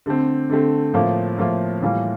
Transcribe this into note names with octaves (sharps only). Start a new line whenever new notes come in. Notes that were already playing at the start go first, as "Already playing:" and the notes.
D3 A3 C4
D3 A3 C4
A2 F3 A#3 F4
A2 F3 A#3 F4
A2 E3 G3 A#3 F4